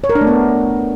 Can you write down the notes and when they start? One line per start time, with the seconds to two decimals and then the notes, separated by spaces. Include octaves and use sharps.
0.04 C#5
0.09 A#4
0.15 D4
0.21 A3
0.27 B3